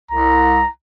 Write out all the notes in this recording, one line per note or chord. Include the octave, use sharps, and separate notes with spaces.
C2 A#5